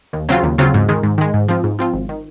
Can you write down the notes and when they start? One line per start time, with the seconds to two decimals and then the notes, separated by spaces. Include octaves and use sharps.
0.13 D#2
0.29 C#3 F#3 C4 F4
0.43 D#2
0.58 C#3 F#3 C4 F4
0.74 G#2
0.89 D#3 G#3
1.03 G#2
1.18 D#3 G#3
1.34 G#2
1.49 F3 C4 F4
1.64 G#2
1.79 F3 C4 F4
1.94 G#1
2.09 D#3